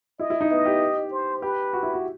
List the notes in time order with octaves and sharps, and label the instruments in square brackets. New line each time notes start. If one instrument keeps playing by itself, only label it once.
[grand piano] E4 [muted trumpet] D#5
[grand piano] E4
D#4
[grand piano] B3 [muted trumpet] D#5
[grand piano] G4
[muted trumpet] C5
[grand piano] G4 [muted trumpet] B4
[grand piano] F#4
E4
F#4